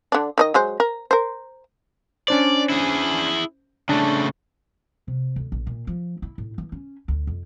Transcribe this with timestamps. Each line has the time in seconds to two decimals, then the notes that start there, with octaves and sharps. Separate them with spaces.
0.12 D3 D4
0.38 D#3 D#4 D#5
0.54 F#3 G#3 C5
0.80 A#4
1.11 A#4 C5
2.28 C#4 D4 C5 D5
2.70 E4 G#4
3.89 C#3 A3 D4 A5
5.08 C3
5.36 D2
5.52 A#1
5.67 A#2
5.87 F3
6.22 E4
6.38 A2
6.58 E3
6.72 C#4
7.08 D2
7.27 F2